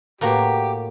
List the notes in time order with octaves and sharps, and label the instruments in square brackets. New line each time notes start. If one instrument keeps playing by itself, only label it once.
[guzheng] A2 A#3 F#4 [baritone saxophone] G4